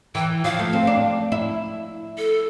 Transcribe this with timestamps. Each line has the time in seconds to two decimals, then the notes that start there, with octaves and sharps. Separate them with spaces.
0.15 E3 G5
0.44 F3 F5
0.59 A3
0.73 C4
0.87 D4
1.32 E4
2.18 A4